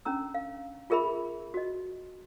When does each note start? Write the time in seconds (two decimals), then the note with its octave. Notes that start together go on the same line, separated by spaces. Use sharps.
0.05 C#4 D4 A#5 E6
0.35 F5
0.90 F4 G#4 A#4 E5 B5
1.54 F#4 D#5